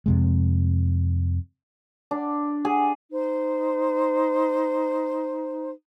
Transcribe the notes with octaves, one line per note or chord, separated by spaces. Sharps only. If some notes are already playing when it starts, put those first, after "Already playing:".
F2 C3 G#3
D4
G#4
D#4 C5